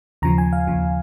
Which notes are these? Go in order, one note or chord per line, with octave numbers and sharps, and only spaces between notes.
D#2 C#3 F3 A#5
G#5
F5
D#2 C#3 F3